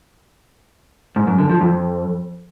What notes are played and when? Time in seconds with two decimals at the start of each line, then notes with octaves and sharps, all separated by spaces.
1.16 G#2
1.27 F#2
1.38 D3
1.50 F3
1.61 F2